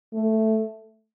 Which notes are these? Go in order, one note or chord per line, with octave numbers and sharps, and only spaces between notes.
A3